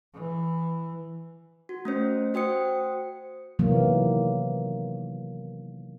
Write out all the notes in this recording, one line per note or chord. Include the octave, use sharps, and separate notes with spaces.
E3
F#4
A3 C#4 C5
F#4 C5 G5 D#6 C#7
C3 D#3 E3 F#3 A#3 B3